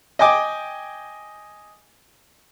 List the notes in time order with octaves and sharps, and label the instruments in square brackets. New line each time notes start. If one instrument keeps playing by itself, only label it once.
[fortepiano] D#5 G5 G#5 D6